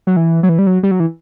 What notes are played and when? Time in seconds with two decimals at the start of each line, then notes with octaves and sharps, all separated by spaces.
0.07 F#3
0.16 E3
0.43 F#3
0.49 E3
0.59 G3
0.67 F#3
0.83 G3
0.91 F#3
1.00 E3